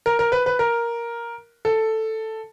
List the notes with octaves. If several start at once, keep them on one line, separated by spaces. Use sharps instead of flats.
A#4
A#4
B4
B4
A#4
A4